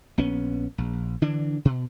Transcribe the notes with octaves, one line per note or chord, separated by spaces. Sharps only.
A#1 B3 C#4
A#1
D3 E3 D4
B2